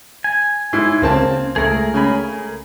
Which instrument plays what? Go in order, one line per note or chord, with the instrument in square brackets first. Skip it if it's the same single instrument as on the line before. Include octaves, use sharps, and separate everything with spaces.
[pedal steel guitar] G#5
[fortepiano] G#2 E4
[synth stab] C#2 C#3 [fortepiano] A#3 C4 A5
[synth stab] C#2 A3 [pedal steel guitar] G#4 A#4
[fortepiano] C#3 G#5 B5